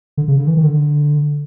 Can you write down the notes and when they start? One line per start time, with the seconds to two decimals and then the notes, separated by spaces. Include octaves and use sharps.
0.17 D3
0.28 C#3
0.38 D3
0.47 E3
0.57 D#3
0.66 D3